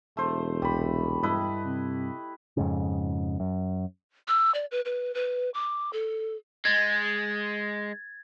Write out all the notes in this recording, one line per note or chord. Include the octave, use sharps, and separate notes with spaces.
E1 A3 C5
C2 G3 B5
G2 E4 B4 D#5
C3
F2 G#2 C#3
F#2
E6
D5
B4
B4
B4
D6
A4
G#3 G#6 A6